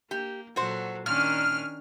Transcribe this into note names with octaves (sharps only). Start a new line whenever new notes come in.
A#3 G4
A#2 F#3 F#4 A4 C5
A#2 D#3 C#4 D4 F6